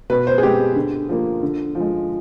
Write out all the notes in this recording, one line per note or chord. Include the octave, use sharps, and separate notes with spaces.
B2 B4
C5
G#4
G#3 C4 G4
D3
F3 A#3
D3
F3
G#3